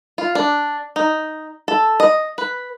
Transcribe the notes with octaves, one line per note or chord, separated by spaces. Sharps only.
F4
D4
D#4
A4
D#5
B4